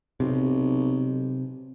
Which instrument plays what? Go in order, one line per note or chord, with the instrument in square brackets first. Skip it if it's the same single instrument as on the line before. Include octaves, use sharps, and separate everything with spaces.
[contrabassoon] B1 [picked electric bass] C3